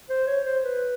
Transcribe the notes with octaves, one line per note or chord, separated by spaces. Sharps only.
C5
C#5
C5
B4